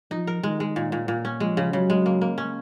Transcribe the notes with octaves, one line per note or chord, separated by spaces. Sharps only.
F3 D#4
A#4
D#3 G#3
G#3
A#2
A#2
A#2
C#4
F3 G#3
C#3
C#3 F#3
G#3
A#3
A#3
C#4